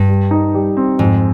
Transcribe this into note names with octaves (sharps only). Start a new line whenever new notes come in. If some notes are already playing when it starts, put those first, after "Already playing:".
Already playing: G2
G3
D#4
G3
C4
F2 G#2